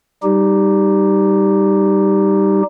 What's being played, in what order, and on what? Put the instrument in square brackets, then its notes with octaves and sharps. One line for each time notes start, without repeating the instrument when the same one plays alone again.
[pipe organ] G3 D#4 G4